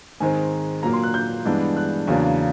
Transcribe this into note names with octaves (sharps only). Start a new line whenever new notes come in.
G#2 D#3 G#3 C4 G#5
A#2 F#3 A#3 A#5
C6
F#6
G6
G2 E3 G#3 B3 D4
F#6
E2 C#3 F#3 A#3 D4